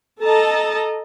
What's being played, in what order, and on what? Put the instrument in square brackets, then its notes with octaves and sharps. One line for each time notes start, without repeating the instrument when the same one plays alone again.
[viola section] A4 D#5 A5 A#5